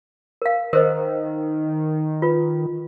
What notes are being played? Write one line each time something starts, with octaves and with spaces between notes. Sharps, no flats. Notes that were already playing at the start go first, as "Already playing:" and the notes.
A#4 F5
D#3 A#4 C5 D#5
F4 B4